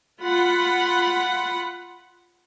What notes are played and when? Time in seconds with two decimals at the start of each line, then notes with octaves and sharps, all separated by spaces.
0.21 F4 F#5 B5